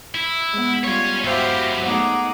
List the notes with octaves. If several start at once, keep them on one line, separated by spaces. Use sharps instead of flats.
E4
G#3 B3
G3 F4 C#5 G#5
F#3 E4 G4 C5 E5 F5
A3 B3 D#4 G#4 F#5 D6